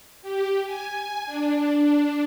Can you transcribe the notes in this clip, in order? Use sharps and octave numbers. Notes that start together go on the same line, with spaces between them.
G4
G#5
D4